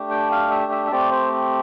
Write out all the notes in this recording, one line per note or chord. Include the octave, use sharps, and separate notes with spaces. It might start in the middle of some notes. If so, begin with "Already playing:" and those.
Already playing: A3 D4 G4
G5
F5
E5
E5
E5
A3 C4 G4 D5
C5